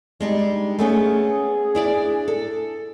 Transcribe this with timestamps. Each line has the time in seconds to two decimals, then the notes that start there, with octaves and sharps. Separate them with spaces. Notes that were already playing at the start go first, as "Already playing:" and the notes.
0.20 G3 G#3 D4 D#4
0.79 A3 B3 C#4 G#4
1.75 D4 E4 D5
2.28 A4